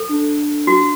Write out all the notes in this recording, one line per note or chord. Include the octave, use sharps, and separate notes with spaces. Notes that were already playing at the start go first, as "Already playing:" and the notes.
Already playing: A4
D4
F#4